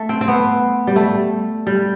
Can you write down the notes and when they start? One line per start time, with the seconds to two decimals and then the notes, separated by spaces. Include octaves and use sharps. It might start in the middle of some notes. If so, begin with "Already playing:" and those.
Already playing: A3
0.09 C4
0.21 C4
0.28 B3
0.87 G3
0.96 A3
1.67 G3